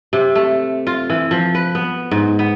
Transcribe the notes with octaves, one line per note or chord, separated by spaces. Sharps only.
C3
A3
F4
E3
F3
B4
B3
G#2
B3